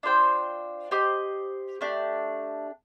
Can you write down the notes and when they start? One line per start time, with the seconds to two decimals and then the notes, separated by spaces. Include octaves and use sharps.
0.03 D4 F4 C5 G5
0.91 G4 C5 D#5
1.81 A3 D4 G4